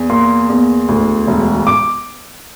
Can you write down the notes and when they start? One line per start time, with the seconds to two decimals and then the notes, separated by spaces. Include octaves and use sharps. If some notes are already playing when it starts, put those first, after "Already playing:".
Already playing: E2
0.10 A#3 C6
0.50 E2
0.89 D2
1.27 E1
1.67 D6